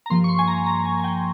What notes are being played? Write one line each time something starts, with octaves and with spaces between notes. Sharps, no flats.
A#5
G2 F3 A#3 C6
C#6
C6
G#5
A#5
A#5
G#5
G#5
G5